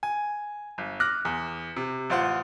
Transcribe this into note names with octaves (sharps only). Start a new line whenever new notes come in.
G#5
G1
D6 F6 F#6 A#6
E2
C3
A1 F4 C5 F#5